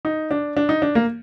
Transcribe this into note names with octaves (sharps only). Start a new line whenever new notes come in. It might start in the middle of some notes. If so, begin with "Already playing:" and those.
D#4
D4
D4
D#4
D4
A#3